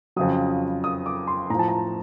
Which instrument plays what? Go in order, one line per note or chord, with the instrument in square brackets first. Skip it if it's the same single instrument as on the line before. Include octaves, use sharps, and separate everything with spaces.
[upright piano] F2 C#3 F#3 D#6
D#6
D6
C6
A2 A#5
F3 A5
A#5